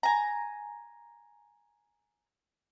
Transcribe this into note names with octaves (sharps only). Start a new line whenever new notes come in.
G#5 A#5